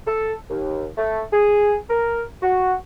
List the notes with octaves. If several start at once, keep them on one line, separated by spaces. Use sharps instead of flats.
A4
D#2
A3
G#4
A#4
F#4